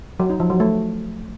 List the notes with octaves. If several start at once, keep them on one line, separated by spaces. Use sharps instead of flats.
F#3
D#4
F3
F#3
A3